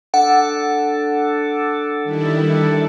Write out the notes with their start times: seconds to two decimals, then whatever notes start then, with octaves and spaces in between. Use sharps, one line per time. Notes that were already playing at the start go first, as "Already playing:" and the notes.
0.14 D4 A4 F#5
2.03 D#3 G3 E4